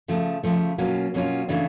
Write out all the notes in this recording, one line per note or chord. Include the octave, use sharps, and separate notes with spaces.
C#3 F3 A3
C#3 F3 A3
B2 F#3 A#3 C#4 F4
B2 F#3 A#3 C#4 F4
C#3 E3 A3 D4